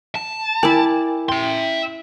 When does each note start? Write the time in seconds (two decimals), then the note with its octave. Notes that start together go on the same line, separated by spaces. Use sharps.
0.15 A5
0.63 E4 A#4 D5 G5 G#5
1.29 E5 G5 C6